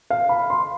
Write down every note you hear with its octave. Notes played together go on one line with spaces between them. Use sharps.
F5
B5
C6